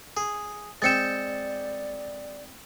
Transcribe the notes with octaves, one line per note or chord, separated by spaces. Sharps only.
G#4
G#3 C4 D5 G5 A6 C#7 E7